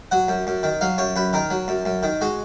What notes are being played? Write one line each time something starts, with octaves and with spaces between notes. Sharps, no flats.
F#3 F#5
F#2
F#2
D#3
F#3 F5
F#2 C#5
F#2 B4
D#3 A#4
F#3
F#2
F#2
D#3
G#3 F#4